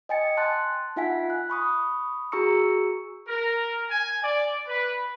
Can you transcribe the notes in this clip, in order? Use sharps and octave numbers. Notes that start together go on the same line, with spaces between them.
D#5 G5 G#5 A6 C#7
A5 C6 F#6 A6
D#4 F4 E5 F#5 G#5 B6
F#6
B5 C#6 D#6
F#4 G#4 A#5 C#6 E6 C#7
A#4
G#5
D5
B4